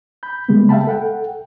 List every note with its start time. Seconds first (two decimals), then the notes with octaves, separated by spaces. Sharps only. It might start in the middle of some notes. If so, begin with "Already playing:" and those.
0.23 B5 G6
0.49 C#3 G3 G#3 A#3 B3
0.69 E5 F5 G5 A5 B5
0.87 A4 F#5 G5